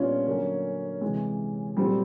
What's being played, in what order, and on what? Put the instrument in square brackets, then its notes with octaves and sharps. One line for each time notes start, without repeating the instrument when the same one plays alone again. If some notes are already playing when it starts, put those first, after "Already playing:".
Already playing: [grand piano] A#2 G3 B3 D4 F4 [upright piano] C#4
[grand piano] D3 F#3 A#3 C#4
C3 E3 G#3
[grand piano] A#2 F#3 A3 C4 [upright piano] G3